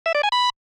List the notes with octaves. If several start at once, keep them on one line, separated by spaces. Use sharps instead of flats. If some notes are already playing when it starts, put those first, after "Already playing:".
E5
D5
G#5
B5